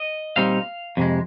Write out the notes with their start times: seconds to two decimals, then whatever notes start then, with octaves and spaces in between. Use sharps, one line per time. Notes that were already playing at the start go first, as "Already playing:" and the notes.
Already playing: D#5
0.36 A#2 G3 C4 D#4 F5
0.97 F2 C3 G#3